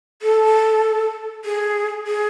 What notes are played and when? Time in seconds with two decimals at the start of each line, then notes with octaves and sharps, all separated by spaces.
0.22 A4
1.45 G#4
2.07 G#4